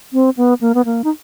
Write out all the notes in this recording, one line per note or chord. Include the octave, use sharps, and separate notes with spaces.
C4
B3
A#3
B3
A#3
D#4